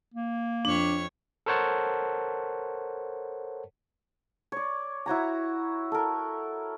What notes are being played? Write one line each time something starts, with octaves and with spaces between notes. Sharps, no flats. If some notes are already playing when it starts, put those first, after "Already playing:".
A#3
F2 D4 C#5
A4 A#4 C5 C#5 F#5 A5
C#5 D5
E4 F#4 C#5 A#5
A4 A#4